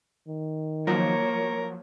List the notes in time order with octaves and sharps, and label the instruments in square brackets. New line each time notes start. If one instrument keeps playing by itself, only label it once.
[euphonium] D#3
[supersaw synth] F3 F#3 [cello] A#3 C#5 [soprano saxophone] A#4